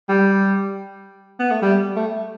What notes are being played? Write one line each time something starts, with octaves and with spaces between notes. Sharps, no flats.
G3
B3
A3
G3
A3